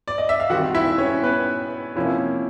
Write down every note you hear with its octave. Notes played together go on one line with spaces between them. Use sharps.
D5
D#5
E5
F5
D#3 G3 C4 F#4 F#5
E4 E5
C#4 C#5
B3 B4
C3 F3 A#3 C#4 E4